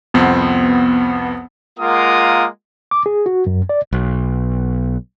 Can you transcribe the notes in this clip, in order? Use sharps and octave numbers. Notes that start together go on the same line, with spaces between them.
C2 F2 B3 C4
G#3 A#3 F4 A#4 F#5 D#6
D6
G#4
F#4
F#2
D5
B1